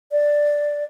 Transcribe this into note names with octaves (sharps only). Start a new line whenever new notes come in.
D5